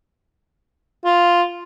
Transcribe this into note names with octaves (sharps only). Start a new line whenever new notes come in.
F4